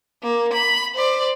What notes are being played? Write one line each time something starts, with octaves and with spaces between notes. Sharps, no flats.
A#3
B5
C5 D5